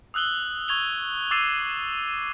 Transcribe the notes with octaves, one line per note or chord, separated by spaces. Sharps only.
D#6 E6 F#6 F#7 G7
C#6 G#6 F7 G7
D6 E6 A6 C7 D#7 E7